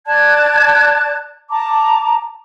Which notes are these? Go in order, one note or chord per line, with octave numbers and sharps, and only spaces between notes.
D5 A5 F#6 G#6
A5 A#5 D6